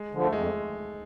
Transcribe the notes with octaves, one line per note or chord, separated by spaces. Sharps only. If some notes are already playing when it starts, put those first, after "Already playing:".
Already playing: G#3
D3 F3
A3
F2 G#3